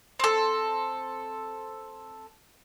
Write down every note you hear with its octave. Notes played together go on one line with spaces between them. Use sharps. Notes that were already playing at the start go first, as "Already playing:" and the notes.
C4 A4